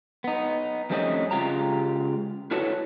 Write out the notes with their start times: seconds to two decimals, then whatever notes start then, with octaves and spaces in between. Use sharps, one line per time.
0.24 B3 D#4
0.90 F2 G3 A3 C4 C#4 D#5
1.31 C#3 G#3 F4 G4 A#5
2.51 E4 F#4 A4 B4 C#5